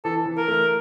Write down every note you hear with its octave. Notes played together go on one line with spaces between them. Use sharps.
E3 A4
E3
A#4
A3